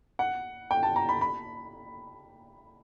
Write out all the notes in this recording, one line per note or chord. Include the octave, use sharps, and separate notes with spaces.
F#5
G5
A5
A#5
B5
B5